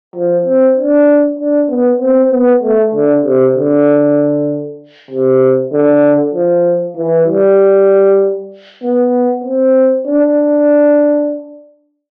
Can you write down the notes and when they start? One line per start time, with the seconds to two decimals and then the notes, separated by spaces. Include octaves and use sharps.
0.16 F3
0.46 C4
0.77 D4
1.39 D4
1.70 B3
2.01 C4
2.32 B3
2.63 A3
2.94 D3
3.25 C3
3.56 D3
5.11 C3
5.72 D3
6.34 F3
6.97 E3
7.27 G3
8.83 B3
9.44 C4
10.06 D4